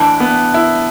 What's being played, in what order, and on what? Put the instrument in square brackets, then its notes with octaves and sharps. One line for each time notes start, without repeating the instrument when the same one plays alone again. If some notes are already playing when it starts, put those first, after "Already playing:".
Already playing: [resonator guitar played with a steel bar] A2 E3 D4
[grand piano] B3
E4